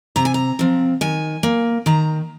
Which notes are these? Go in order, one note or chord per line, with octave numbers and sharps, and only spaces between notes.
C3 A#5
G#5
A#5
F3 C4
D#3 G#5
A#3
D#3 A#5